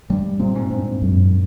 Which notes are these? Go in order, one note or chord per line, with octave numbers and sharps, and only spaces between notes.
G2 G3
A#2 C4
G#2
G2 C4
F#2